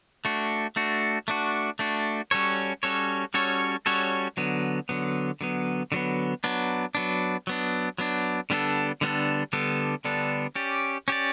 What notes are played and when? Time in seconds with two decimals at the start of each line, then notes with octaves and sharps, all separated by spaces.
0.25 A3 D4 F#4
0.76 A3 D4 F#4
1.28 A3 D4 F#4
1.79 A3 D4 F#4
2.31 G3 C#4 F#4 A4 C#5
2.83 G3 C#4 F#4 A4 C#5
3.34 G3 C#4 F#4 A4 C#5
3.86 G3 C#4 F#4 A4 C#5
4.37 D3 F#3 B3
4.89 D3 F#3 B3
5.41 D3 F#3 B3
5.92 D3 F#3 B3
6.44 F#3 B3 D4
6.95 F#3 B3 D4
7.47 F#3 B3 D4
7.98 F#3 B3 D4
8.50 D3 G3 B3 D4 A4
9.01 D3 G3 B3 D4 A4
9.53 D3 G3 B3 D4 A4
10.05 D3 G3 B3 D4 A4
10.55 C#4 G4 D5
11.08 C#4 G4 D5